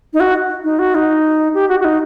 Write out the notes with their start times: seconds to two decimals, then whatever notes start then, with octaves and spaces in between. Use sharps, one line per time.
0.14 D#4
0.20 F#4
0.64 D#4
0.79 F#4
0.95 D#4
1.54 G4
1.69 F#4
1.80 F#4
1.85 D#4